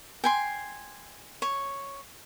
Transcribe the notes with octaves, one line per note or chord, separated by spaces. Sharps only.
G5 G#5 C6
C#5